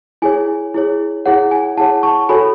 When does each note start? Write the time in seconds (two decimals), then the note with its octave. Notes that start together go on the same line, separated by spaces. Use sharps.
0.22 E4 G#4 C#5 G#5
0.74 E4 G#4 C#5
1.26 E4 G#4 C#5 F#5
1.51 G#5
1.77 E4 G#4 C#5 F#5 A5
2.03 A5 C#6
2.29 F#4 A4 C#5 G#5 B5